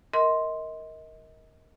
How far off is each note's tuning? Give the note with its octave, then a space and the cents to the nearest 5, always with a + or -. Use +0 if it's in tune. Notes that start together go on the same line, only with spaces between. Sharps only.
A#4 +0 D#5 +30 C6 +0